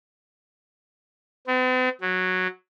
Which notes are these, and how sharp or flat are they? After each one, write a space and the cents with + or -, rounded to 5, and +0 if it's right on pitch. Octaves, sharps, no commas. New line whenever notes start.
C4 -45
F#3 -5